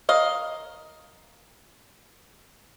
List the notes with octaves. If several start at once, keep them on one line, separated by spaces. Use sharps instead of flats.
A#4 D#5 F5